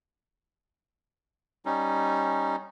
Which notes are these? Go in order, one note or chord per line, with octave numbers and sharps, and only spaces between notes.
G3 C#4 D#4